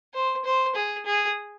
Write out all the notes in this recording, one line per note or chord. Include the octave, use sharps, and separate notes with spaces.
C5
C5
G#4
G#4